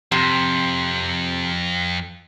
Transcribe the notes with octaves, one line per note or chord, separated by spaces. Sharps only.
F2 C3